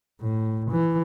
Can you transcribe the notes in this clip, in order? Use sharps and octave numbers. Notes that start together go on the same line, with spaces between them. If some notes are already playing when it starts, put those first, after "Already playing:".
A2
E3